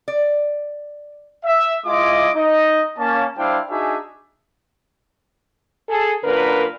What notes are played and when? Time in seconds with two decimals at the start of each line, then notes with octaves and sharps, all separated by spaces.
0.08 D5
1.44 E5
1.86 G#3 E4 F4 D#5 D6
2.35 D#4 D#5
2.97 A#3 C#4 A5
3.37 G3 D4 E4 C5 F5 G5
3.69 D4 D#4 F#4 G#4 E5 G#5
5.90 G#4 A4
6.24 F#2 A#2 D3 A#4 B4